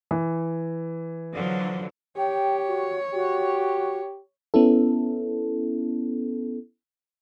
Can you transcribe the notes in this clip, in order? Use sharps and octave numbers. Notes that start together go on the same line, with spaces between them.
E3
D3 F3 F#3
G4 C#5 G5
F#4
F#4 G4
B3 C#4 E4 A4